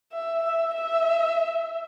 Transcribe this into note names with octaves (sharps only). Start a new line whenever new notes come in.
E5
E5
E5